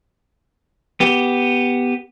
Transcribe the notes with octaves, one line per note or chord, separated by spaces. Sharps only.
B3 G4